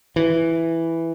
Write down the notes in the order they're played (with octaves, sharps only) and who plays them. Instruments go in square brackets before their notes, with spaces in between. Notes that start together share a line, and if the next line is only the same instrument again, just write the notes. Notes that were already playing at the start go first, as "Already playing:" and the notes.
[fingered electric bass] E3